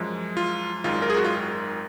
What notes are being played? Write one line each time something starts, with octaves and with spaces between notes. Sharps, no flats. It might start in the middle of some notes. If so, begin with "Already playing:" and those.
Already playing: F#2 F3 G#3
F4
G#1 F#2 D#3 G#3 F4
A#4
G#4
F#4
F4